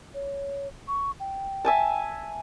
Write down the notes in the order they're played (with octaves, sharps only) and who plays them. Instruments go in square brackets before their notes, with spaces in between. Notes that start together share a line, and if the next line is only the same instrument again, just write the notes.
[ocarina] C#5
C#6
G5
[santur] E5 G#5 A5